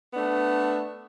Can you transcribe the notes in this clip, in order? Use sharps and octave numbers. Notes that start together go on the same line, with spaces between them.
A3 B3 D4